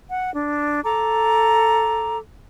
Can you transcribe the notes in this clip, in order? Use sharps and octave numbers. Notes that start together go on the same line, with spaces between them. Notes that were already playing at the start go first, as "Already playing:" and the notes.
F#5
D4
A4 A#5 D6